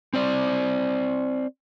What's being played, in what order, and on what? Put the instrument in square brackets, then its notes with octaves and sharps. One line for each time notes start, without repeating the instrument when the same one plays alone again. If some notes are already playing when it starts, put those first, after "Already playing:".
[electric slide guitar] C4 C5 D5